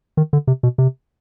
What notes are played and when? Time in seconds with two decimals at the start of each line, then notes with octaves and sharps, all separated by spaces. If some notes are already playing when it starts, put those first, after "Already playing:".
0.17 D#3
0.33 D3
0.47 C3
0.63 B2
0.78 C3